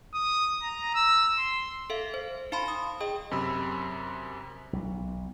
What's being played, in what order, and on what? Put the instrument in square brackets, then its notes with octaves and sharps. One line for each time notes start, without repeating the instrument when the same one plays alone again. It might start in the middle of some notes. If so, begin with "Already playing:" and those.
[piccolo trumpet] D#6
A#5
E6
C6
[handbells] A4 E5 F5
C5
D#4 F5 A5 B5 C6
D#6
G#4 D#5 G5 D#6
[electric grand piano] F#2 C3 B5 E6
[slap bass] B1